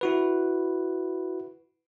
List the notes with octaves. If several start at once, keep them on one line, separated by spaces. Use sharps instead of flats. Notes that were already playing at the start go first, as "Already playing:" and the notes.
E4 F#4 B4